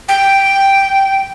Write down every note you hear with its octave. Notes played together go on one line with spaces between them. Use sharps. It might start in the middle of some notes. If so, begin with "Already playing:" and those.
G5